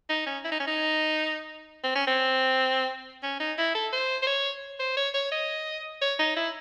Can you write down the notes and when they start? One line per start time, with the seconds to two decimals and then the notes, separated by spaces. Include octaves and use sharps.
0.09 D#4
0.26 C#4
0.44 E4
0.52 D#4
0.60 C#4
0.67 D#4
1.84 C4
1.95 C#4
2.07 C4
3.23 C#4
3.40 D#4
3.58 E4
3.75 A4
3.92 C5
4.22 C5
4.27 C#5
4.79 C5
4.97 C#5
5.14 C#5
5.32 D#5
6.01 C#5
6.19 D#4
6.36 E4